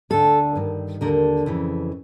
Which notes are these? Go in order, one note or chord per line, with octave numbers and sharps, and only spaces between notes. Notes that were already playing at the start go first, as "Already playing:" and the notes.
D2 D3 A4
G2 D#3
D#2 D3 A#4
F2 C#3 E3